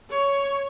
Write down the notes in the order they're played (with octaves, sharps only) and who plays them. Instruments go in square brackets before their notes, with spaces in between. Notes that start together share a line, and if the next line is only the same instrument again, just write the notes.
[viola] C#5